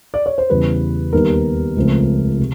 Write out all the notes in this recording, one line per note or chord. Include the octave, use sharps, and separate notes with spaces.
D5
C#5
C5
E2 C#3 E3 G3 B4
D#2 D#3 G3 B3 A#4
C#2 C#3 F3 A3 C4
C3